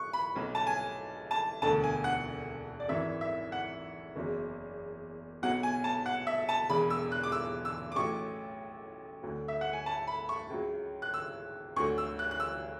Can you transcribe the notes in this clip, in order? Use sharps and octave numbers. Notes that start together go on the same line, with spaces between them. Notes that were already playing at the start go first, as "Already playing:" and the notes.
Already playing: C#6 F#6
B5
B1 B2 F#3
A5
G#5
A5
E1 D2 D3 A5
G#5
F#5
D5
G#1 F#2 E3 E5
E5
F#5
F#1 E2 C#3 F#3
B1 B2 F#3 F#5
G#5
A5
F#5
E5
A5
E1 E2 C#3 B5
E6
F#6
D6
E6
E6
D6
A1 A2 F#3 C#6
D2 D3 F#3
E5
F#5
G#5
A5
B5
C#6
C#2 C#3 F#3
F#6
E6
D2 D3 F#3 C#6
E6
F#6
F#6
E6